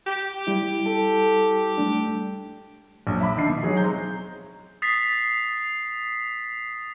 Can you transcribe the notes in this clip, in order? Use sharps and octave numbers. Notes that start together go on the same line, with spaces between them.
G4
G3 E4
A4
G3 A3 D4
A#1 F#2
E5 B5 D6
D#3 D4 C7
B2
F#3 D#4 G#4 C#5
G#3 C4 A#5 G6
D#6 A6 B6 C7